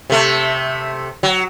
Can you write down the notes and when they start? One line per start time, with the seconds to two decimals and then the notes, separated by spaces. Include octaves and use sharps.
0.10 C3 A3
1.23 F#3